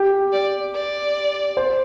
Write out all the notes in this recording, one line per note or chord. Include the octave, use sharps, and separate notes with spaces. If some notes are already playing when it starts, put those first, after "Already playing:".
Already playing: G4
D5
D5
C5